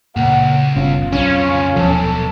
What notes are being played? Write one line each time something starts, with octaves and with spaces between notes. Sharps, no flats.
C#2 A#2 F#5
G1 B2 C#4 F4
B1 F2 C#3 C#4
D#1 B1 F3 A4